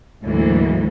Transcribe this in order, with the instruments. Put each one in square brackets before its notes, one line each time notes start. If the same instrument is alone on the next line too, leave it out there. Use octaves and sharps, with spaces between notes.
[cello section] D2 G#2 E3 F#3 A#3